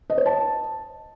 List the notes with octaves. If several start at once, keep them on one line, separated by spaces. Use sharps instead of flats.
D#5
C#5
A5